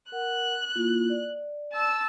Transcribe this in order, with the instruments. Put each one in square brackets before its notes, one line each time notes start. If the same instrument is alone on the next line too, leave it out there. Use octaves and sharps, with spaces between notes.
[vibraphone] A#4 F#5 [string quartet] F#6
[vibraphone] A#3 E4 F4
D5
[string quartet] A5 E6